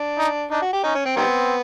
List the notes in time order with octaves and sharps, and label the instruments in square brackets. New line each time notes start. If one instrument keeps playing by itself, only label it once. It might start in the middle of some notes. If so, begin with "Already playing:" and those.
Already playing: [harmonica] D4
[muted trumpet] D#4
[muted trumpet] D4 [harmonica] D#4
[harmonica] F#4
G4
[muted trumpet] C#4 [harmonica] D#4
[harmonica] C#4
C4
[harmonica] D#3 G3 B3 [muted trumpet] C4